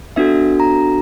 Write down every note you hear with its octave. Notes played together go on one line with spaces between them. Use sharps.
B3 D4 F#4 A4 E5
A#5